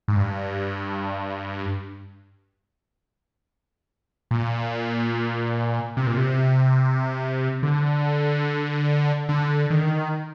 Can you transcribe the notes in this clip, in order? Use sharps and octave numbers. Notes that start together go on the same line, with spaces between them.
G#2
G2
A#2
C3
A#2
C3
D3
D3
D#3